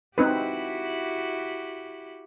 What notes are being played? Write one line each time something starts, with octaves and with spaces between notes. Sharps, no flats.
C4 D#4 E4 F#4 G4 B4